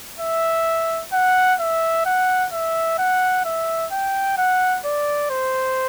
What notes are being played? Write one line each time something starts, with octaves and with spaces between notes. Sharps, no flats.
E5
F#5
E5
F#5
E5
F#5
E5
G5
F#5
D5
C5